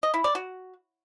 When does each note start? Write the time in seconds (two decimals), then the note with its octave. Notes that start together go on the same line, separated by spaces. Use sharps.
0.03 D#5
0.14 E4
0.24 D5
0.35 F#4